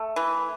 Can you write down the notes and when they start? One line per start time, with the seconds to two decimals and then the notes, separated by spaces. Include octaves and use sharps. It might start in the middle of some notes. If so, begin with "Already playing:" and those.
Already playing: A3
0.16 E3